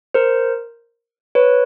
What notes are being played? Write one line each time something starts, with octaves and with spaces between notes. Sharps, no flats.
A#4 C5
B4 C#5